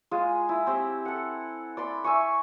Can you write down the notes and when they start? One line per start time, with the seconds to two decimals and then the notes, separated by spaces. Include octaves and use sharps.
0.11 G#3 F4 G#4
0.49 E4
0.67 C4 G4
1.05 A4 F#5
1.77 D5 B5 C6
2.04 E5 G#5 C#6